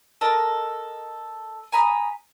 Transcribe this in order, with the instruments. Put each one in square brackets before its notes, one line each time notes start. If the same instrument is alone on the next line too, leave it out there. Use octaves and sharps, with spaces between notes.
[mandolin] A4 A#4 D#5
G#5 A#5 B5 D#6